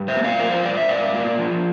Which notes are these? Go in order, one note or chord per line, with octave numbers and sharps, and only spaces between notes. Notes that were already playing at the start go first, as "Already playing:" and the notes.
Already playing: G2
C5 E5
A#3
D5 F5
F3 A#4
C5
G2 D5
E5
G2 D5 F5
A#3
F3